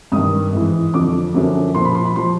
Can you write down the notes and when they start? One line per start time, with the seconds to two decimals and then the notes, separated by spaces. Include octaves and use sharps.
0.12 G2 D#3 D#6
0.53 G#2 E3
0.94 F2 D3 F3 D6
1.34 F#2 D3 F3
1.74 A#2 F3 C6
1.85 B5
1.95 C6
2.05 B5
2.16 F3 C6